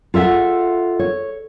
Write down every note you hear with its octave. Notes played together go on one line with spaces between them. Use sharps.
F4 A4 E5 F#5
C#5